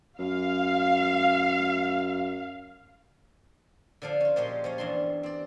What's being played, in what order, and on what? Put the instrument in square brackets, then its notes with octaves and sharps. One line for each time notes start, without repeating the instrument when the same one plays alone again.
[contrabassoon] F#2 [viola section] F5
[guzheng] D3 F3 D4 F5
C#4 F4
A#2 F3 G#3 G4 C#5 C6
F3 C#4 C#5
E2 G2 D4 C6
C4 D5